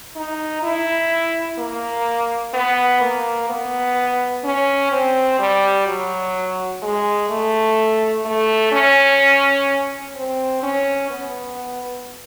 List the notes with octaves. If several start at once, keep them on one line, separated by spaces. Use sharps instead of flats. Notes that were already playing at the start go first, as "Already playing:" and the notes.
D#4
E4
A#3
B3
A#3
B3
C#4
C4
G3
F#3
G#3
A3
A3
C#4
C4
C#4
B3